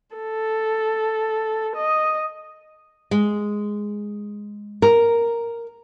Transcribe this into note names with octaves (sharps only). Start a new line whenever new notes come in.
A4
D#5
G#3
A#4